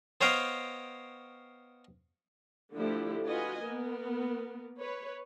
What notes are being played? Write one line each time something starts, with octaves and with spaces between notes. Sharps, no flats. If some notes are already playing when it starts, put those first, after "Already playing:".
B3 C5 C#5 D#5 F5 G5
D3 F3 A3 D4 E4 G4
F4 F#4 B4 D#5 G#5
A#3 B3 A#4
B4 C#5